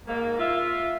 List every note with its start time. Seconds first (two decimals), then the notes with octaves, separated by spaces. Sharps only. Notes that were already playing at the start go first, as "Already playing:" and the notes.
0.06 G#2 A#3
0.39 F4 E5